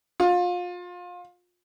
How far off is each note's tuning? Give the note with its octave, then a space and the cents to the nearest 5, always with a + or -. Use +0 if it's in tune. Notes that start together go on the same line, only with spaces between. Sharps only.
F4 +30